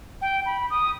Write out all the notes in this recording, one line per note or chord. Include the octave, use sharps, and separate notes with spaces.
G5
B5
D#6